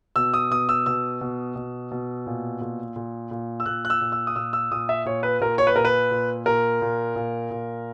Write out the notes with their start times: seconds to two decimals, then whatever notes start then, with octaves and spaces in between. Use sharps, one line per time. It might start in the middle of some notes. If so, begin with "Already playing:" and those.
0.16 B2 E6
0.34 D#6
0.50 B2 D#6
0.69 E6
0.86 B2 E6
1.21 B2
1.56 B2
1.91 B2
2.26 A#2
2.61 A#2
2.96 A#2
3.31 A#2
3.60 E6
3.66 A#2 F#6
3.85 F#6
3.90 E6
4.01 A#2
4.12 E6
4.27 D#6
4.35 A#2 E6
4.53 E6
4.71 A#2 D#6
4.89 E5
5.06 A#2 C#5
5.23 B4
5.40 A#2 A#4
5.58 C#5
5.67 B4
5.76 A#2 A#4
5.85 B4
6.11 A#2
6.46 A#2 A#4
6.82 A#2
7.16 A#2
7.51 A#2